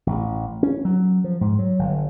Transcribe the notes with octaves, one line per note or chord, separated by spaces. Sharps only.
A1
C#4
F#3
F3
G#2
F#3
G1